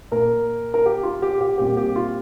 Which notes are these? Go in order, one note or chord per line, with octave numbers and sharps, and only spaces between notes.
A#2 A#3 A#4
A#4
G4
F4
G4
G4
A#2 G3 C4 G4
G4
F4